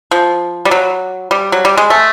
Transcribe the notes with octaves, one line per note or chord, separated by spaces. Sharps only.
F3
G3
F#3
G3
F#3
G3
G#3
A3